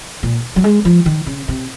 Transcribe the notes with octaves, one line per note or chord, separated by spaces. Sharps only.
A#2
F#3
G#3
F3
D#3
C#3
C3